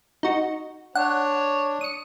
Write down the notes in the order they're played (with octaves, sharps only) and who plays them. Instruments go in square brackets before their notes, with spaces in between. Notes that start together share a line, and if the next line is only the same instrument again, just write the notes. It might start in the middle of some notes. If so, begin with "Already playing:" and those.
[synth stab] D#4 F#4
[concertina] D4 [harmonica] C#5 [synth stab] F#5
[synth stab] D#6 C#7